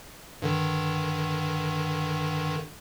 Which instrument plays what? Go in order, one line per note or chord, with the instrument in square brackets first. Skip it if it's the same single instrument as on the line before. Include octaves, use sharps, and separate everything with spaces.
[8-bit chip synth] G2 D3 D#3